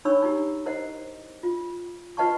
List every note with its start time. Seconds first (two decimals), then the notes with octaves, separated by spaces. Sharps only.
0.05 D4 D#4 C#5 B5 C#6 E6
0.22 D#4 E4 G4
0.66 E4 A#4 C5 D#5 F#5
1.43 F4
2.17 F4 B4 D#5 F#5 A5 C#6